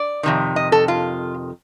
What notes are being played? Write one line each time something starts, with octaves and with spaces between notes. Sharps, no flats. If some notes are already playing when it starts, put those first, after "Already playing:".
Already playing: D5
F2 C3 D#3
D#5
A4
F4